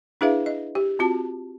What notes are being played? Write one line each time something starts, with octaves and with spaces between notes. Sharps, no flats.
D4 E4 G#4 B4 E5 F5
D#5
G4
C4 F4 F#4 A5